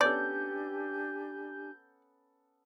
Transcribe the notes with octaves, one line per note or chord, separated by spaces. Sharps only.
B3 C#4 D4 G4 A4 D5 G#5 G6